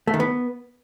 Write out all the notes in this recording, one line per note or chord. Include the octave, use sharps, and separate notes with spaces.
A3
D#3
B3